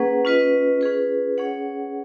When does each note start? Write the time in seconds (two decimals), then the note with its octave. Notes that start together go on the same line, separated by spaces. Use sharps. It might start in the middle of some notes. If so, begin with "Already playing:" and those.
Already playing: A#3 C#4 G#4 B4 F#5
0.25 C#4 F4 B4 D#5
0.81 C#4 F4 G#4 B4
1.38 C#4 G#4 C#5 F#5